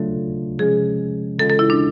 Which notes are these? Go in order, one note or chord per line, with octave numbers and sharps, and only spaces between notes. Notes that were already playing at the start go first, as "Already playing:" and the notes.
Already playing: C#3 F#3 A3 D4 F4 A4
C3 F3 G#3 C#4 G#4
C#3 E3 G#3 C#4 F4 A4
A4
E4
D4